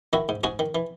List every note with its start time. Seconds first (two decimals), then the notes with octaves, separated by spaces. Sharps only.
0.13 D#3 E4 F#4
0.29 G#2
0.44 G#2 F#4 G#4
0.59 D#3
0.75 E3